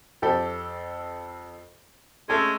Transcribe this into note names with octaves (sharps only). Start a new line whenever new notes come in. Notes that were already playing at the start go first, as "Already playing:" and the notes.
F2 G4 A4
G#3 A3 C#4 A4